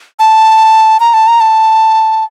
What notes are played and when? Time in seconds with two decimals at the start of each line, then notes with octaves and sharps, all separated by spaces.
0.19 A5
1.00 A#5
1.14 A5
1.28 A#5
1.40 A5